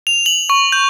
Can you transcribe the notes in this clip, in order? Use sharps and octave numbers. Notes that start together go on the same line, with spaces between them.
F7
F#7
C#6
G6